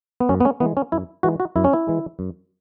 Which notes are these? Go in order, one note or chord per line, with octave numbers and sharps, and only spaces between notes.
B3
F#2 C#4
B3
C#4
E3 G#3 B3
C#4
F#2 E4
E3 G#3 F#4
F#4
F#2 E4
C#4
E4
E3 G#3
F#2